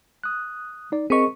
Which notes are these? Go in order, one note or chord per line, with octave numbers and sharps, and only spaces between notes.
D#6 F#6
D#4 D5
C4 G#4 A#4 D#5 C#6